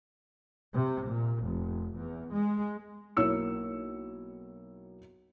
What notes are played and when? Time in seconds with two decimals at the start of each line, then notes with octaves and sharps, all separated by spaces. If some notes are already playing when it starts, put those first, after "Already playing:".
0.73 C3
1.05 A#2
1.43 F1
1.96 E2
2.33 G#3
3.17 B1 A#3 E4 C#5 E6 C#7